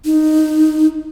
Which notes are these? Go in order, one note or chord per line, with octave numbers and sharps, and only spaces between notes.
D#4